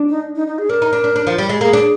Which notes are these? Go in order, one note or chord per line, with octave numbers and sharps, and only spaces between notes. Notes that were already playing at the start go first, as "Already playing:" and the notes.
Already playing: D4
D#4
D#4
D#4
G#4
D4 A#4
D#4
D4
D4
D4
F3
G3
G#3
A#3 G#4
D4